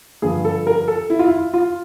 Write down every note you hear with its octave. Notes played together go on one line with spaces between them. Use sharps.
G2 D3 F3 G#4
A4
A#4
A4
E4
F4
E4
F4